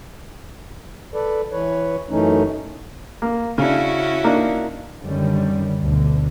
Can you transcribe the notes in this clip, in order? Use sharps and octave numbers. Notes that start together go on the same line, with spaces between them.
A4 B4 D5
E3 B4 C#5
F#2 E3 A3 C#4 D#4
A#3
C#3 C#4 D4 E4 F#4
A#3 D4 D#4
F#2 D3 D#3 G3 C#4
D2 B2 D3